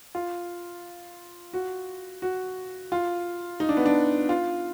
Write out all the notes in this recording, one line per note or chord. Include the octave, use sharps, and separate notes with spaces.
F4
F#4
F#4
F4
D#4
D4
B3
D4
F4